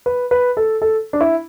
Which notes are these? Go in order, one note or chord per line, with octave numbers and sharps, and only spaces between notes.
B4
B4
A4
A4
D4
E4